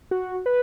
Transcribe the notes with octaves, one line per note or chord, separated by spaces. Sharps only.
F#4
B4